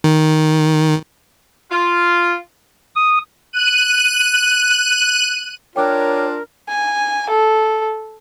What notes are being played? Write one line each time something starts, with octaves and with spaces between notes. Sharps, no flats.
D#3
F4
D#6
F#6 D#7
D4 F4 A#4 C#5 G5 D6 F#6
G#5
A4